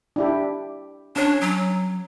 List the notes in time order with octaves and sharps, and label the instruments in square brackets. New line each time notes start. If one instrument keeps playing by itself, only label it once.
[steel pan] D4 E4 G4
[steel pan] C#4 C#5 [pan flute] D4
[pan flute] F#3